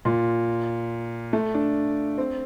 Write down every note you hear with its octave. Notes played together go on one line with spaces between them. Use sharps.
A#2
A3
D4
C4